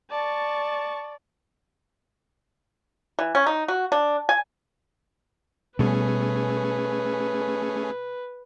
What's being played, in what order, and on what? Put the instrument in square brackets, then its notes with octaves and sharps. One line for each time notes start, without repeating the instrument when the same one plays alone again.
[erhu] D5 [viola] A5 C#6
[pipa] E3
C#4
D#4
F#4
D4
G#5
[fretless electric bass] B2 G3 B3 [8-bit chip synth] A3 C#4 G#4 [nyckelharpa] B4